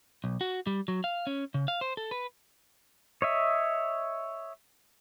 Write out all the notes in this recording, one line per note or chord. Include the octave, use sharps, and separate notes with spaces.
B1
F#4
G3
F#3
F5
C#4
C#3
F5
C5
A4
B4
C#5 D#5 E5